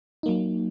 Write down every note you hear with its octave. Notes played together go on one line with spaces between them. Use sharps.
F#3 A#3 D#4